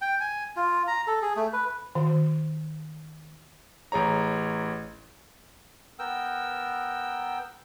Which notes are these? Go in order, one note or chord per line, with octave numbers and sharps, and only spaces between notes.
G5
G#5
F4
A#5
A4
G#4
A3
B4
D#3
A1 G#4 C#5 A#5
B3 A#4 G5 E6